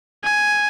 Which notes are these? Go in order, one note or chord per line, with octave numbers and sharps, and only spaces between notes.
G#5